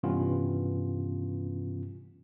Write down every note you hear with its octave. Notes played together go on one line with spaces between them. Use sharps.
G2 C3 E3 B3 C#4 F4